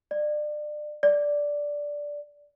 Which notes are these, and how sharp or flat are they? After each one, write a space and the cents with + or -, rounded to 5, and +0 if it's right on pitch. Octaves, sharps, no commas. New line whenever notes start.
D5 +30
D5 -5